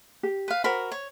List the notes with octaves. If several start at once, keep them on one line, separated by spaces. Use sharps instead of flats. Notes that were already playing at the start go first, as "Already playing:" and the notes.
G4
B4 F5
F#4 A#4 C5 B5
C#5